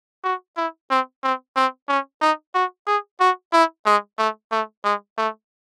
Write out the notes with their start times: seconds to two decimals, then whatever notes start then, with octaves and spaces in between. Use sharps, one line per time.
0.24 F#4
0.57 E4
0.90 C4
1.23 C4
1.56 C4
1.89 C#4
2.21 D#4
2.55 F#4
2.87 G#4
3.20 F#4
3.53 E4
3.86 G#3
4.18 A3
4.52 A3
4.84 G#3
5.18 A3